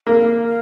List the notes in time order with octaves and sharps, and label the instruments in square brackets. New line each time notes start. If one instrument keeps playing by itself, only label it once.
[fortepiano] A#3 [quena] F5